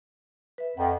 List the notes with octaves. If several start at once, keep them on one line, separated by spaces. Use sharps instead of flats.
B4 E5
F2 F#5